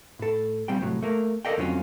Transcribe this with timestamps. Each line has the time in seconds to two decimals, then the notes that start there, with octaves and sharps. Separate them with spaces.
0.19 A2 A4
0.68 A#2 G3 C4 G5
0.81 C2 A2 F#3
1.03 A3 A#3
1.45 A4 A#4 D5 D#5 F5 G5
1.58 F2 D3 F#3 C4 C#4 F4